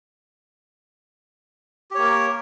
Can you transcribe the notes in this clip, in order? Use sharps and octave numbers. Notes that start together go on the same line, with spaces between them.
A#3 G4 A#4 C#5